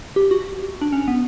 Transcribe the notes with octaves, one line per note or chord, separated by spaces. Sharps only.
G4
F#4
D4
C#4
B3